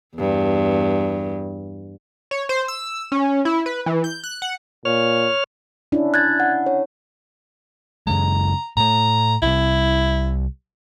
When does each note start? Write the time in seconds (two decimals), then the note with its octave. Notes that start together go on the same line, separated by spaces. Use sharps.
0.16 E2 G2
2.31 C#5
2.49 C5
2.68 E6
3.12 C#4
3.45 E4
3.66 B4
3.86 E3
4.04 G6
4.24 F#6
4.42 F#5
4.85 A#2 C#5 F6
5.92 C#4 D4 E4
6.14 F#6 G#6 A6
6.40 F#5
6.66 C#5
8.07 F#2 C#3 G#3 A#5
8.77 A2 A3 A#5
9.42 C2 G3 E4